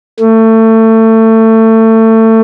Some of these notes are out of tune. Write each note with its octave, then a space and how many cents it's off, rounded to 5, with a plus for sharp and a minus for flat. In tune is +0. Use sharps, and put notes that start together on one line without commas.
A3 +25